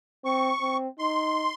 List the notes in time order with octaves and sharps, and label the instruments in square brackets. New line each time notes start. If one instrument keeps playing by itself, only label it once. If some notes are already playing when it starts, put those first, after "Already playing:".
[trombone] C4 [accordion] C#6
[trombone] C4
[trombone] D#4 [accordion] C6